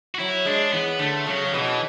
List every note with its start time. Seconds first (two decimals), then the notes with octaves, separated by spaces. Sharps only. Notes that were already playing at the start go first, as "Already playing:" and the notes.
0.15 F#4
0.19 F#3 E4
0.45 G#3 D4
0.73 E3 B3
0.99 D3 A3
1.26 C#3 F#3
1.46 C#3
1.54 B2 E3